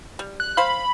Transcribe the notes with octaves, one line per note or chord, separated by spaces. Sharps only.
G3
F#6
C5 F5 B5